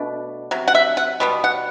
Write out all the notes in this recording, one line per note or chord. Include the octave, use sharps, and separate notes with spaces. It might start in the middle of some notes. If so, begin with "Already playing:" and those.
Already playing: B2 A3 D4
C3 F#3
F#5
E5
F#5
B2 G3 B3
F#5